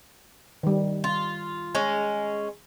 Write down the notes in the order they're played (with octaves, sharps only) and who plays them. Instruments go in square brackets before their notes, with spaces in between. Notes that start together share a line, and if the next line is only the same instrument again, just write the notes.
[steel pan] D#3 G3
[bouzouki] F4
G#3 C#4